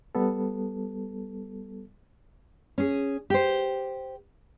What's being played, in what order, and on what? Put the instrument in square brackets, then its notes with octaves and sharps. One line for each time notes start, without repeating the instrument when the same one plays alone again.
[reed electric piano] G3 B3 A4
[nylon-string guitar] C#4 G#4
G4 C5